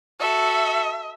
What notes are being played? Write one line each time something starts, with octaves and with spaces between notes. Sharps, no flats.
F#4 A4 E5